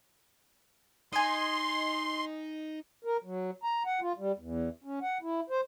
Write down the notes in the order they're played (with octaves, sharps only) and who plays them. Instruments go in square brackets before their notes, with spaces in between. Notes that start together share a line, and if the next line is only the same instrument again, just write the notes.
[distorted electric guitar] D#4 [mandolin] D#5 G#5 [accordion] C6
[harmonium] A#4
F#3
A#5
F#5
F4
G3
E2
C#4
F#5
E4
C5